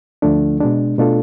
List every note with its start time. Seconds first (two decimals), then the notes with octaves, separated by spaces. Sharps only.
0.22 D2 D3 F3 A3 D4
0.60 B2 G#3 D4
0.98 B2 A3 D4 F4 A4